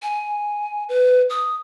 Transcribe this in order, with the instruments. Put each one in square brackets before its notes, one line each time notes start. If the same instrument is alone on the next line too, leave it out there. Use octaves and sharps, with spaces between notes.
[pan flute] G#5
B4
D#6